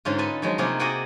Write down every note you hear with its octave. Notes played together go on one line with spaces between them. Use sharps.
G#2 D3 C#4 D#4 F4
A4 B4 G#5 A5
D#3 F3 F#3 G#3
C3 A3 A#3 D#4 F4 G#4
F#4 G#4 D5 D#5 F#5 G5